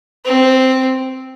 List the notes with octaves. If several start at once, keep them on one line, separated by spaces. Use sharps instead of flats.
C4